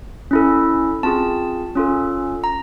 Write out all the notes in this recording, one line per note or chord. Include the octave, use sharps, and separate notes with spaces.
C#4 E4 A4
C4 F4 G#4 A5
C#4 F4 A4
A#5